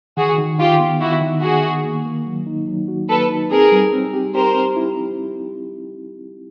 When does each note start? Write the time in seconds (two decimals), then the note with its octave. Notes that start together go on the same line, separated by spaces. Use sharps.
0.17 D#3 F#4 G#4
0.38 D#3
0.59 D#3 F4 G4
0.80 B3
1.00 D#3 E4 F#4
1.21 D#3
1.42 D#3 F#4 G#4
1.63 D#3
1.84 A#3
2.06 A#3
2.26 F#3
2.47 D#4
2.67 F#3
2.88 F#4
3.09 A#3 A4 B4
3.29 D#4
3.50 C4 G#4 A#4
3.72 G3
3.93 C4
4.13 G4
4.34 G4 A#4 C5
4.55 C4
4.76 E4